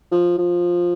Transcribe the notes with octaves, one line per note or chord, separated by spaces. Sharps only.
F3
F3